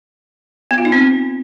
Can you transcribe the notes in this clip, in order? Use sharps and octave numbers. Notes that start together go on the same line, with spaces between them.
B3
F4
D#4
C4